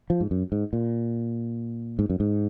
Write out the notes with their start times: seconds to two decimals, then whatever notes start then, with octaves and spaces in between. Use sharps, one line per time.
0.10 F3
0.20 G#2
0.31 F#2
0.52 G#2
0.73 A#2
1.99 G#2
2.10 F#2
2.20 G#2